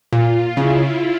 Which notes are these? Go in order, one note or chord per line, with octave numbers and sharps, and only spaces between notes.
A#2 F4
C#3 E4